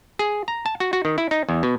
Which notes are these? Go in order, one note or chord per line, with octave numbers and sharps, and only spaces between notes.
G#4
A#5
A5
F#4
F#4
D#3
E4
D#4
E2
B2